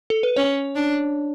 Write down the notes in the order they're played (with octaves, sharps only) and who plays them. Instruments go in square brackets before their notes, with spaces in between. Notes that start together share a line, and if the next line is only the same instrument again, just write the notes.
[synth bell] A4
B4
[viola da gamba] C#4 [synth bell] C#5
[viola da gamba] D4